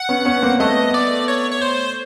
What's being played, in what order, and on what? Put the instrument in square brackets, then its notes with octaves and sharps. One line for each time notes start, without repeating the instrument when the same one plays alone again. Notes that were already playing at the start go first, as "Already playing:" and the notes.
Already playing: [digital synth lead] F#5
[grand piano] B3 C#4
B3 C#4
A#3 C4
[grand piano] A3 B3 [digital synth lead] D#5
[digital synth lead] D5
C#5
C#5
C5